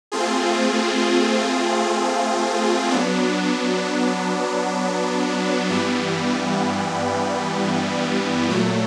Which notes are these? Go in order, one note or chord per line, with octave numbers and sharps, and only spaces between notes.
A3 C4 F4 G#4
F#3 B3 D4
G2 E3 G3 B3
A#2 F#3 A3